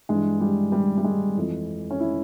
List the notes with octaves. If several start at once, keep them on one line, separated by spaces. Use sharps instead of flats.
G2 E3 G#3
G3
G3
G3
G#3
F2 E3
C#4
E4